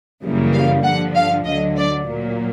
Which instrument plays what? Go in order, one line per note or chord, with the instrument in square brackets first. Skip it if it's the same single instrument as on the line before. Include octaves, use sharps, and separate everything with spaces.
[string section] F#2 C#3 E3 G3 A#3
F5
G2 D3 F3 F#5
F5
D2 D3 F#3 D#5
D5
A#2 F#3 A#3